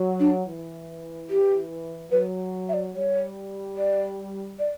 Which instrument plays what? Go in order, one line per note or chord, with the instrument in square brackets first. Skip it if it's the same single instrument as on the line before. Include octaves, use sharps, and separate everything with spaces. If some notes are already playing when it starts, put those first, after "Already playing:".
Already playing: [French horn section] F#3
[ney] D4
[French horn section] E3
[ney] G4
[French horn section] F#3 [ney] B4
[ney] E5
D5
[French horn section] G3 [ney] C#5
[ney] D5
D5